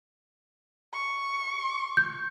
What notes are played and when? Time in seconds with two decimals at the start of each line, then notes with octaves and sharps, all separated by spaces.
0.93 C#6
1.97 G6